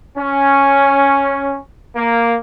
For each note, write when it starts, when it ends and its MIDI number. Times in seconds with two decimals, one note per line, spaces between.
0.16 1.56 61
1.96 2.35 58